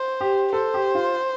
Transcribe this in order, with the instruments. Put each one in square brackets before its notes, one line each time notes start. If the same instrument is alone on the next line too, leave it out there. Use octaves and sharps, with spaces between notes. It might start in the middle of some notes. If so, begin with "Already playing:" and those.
Already playing: [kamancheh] C5
[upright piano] G4
[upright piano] A4 [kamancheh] C5
[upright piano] G4
F4